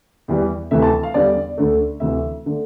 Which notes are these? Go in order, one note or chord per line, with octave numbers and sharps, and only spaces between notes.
E2 E3 G3
D2 C3 E3 A3 E5
A5
F5
E2 D3 G3 D5
D2 D3 A3
D2 C3 E3 E5
D3 A3